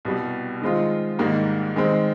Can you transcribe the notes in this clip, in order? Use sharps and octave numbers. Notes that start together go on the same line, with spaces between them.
C2 B2 G3
D#3 G#3 C4 F4
G#2 D#3 G3 A#3
D#3 G#3 C4